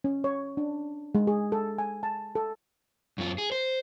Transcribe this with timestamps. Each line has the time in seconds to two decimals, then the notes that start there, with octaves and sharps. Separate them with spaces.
0.04 C#4
0.24 C#5
0.57 D4
1.15 G#3
1.27 G#4
1.52 A4
1.78 G#5
2.03 A5
2.35 A4
3.18 F#2 F4
3.38 G#4
3.52 C5